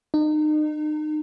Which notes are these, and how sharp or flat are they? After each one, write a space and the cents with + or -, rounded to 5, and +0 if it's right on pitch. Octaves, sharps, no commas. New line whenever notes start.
D#4 -35